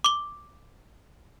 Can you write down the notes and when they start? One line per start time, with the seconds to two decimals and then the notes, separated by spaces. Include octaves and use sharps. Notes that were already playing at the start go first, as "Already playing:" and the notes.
0.04 D6 G7